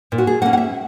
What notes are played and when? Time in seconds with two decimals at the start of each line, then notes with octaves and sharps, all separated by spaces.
0.12 A#2
0.18 F#4
0.27 G#4
0.42 A#3 F#5
0.46 C#4
0.53 F#5
0.58 E5